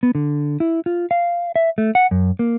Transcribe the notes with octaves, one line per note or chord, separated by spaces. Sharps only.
B3
D3
E4
F4
F5
E5
A3
F#5
F#2
A#3